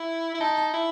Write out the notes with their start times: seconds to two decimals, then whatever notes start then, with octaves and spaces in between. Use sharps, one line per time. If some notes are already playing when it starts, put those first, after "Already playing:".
Already playing: E4
0.34 E4
0.40 D#4 A5
0.74 E4